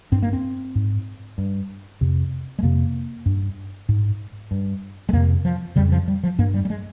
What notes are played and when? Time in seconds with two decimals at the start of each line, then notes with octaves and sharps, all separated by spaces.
0.12 G2 C4
0.23 A#3
0.33 C4
0.75 G#2
1.38 G2
2.01 F2 C3
2.59 G#3
2.62 F2 C3 A#3
3.26 G2
3.89 G#2
4.51 G2
5.09 G#3
5.13 F2 C3 A#3
5.45 F3
5.76 F2 C#3 G3
5.92 F3
6.08 G3
6.23 F3
6.39 G2 A#3
6.54 G3
6.65 G3
6.70 G#3